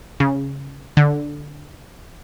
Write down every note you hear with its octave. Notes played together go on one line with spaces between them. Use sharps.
C#3
D3